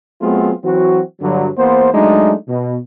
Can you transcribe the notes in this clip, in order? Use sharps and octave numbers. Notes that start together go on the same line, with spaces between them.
F#3 A3 B3 C4 F4 G#4
E3 F#3 C4 F#4
G2 D3 F#3
E2 A#3 B3 C5
F#3 G#3 A3 D4 D#4
B2